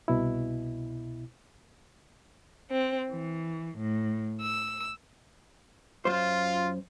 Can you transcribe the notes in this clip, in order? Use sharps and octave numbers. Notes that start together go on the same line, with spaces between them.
C2 B2 E4
C4
E3
A2
E6
F#2 F4 C5